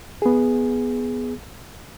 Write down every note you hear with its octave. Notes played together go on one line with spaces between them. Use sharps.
B3 G#4